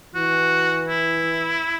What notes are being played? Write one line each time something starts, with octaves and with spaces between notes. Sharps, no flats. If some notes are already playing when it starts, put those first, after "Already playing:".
E3 F#4
E4